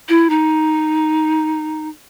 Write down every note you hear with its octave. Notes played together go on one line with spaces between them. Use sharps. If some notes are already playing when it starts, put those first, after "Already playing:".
E4
D#4